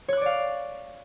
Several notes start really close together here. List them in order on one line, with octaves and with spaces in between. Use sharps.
C#5 F#6 D6 D5 F5